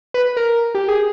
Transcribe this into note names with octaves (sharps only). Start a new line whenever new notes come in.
B4
A#4
G4
G#4